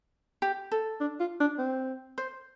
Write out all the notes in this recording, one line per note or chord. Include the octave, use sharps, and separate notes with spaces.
G4
A4
D4
F4
D4
C4
C5